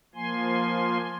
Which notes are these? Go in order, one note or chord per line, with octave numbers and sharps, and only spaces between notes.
F3 A#3 G#5 C6